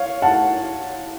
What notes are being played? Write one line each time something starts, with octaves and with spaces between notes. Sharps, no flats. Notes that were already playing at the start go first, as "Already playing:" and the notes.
Already playing: C#5 F5
F#5 A5